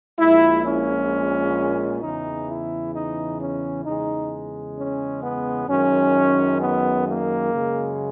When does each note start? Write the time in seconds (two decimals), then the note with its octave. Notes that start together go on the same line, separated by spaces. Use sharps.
0.19 A#1 A#2 G#3 E4
0.65 C#4
2.02 E2 C#3 E3 D#4
2.48 E4
2.94 D#4
3.39 C#4
3.85 E2 C#3 G#3 D#4
4.77 C#4
5.23 B3
5.68 F#2 D#3 G#3 C#4
6.60 B3
7.06 A#3
7.52 F#2 C#3 G#3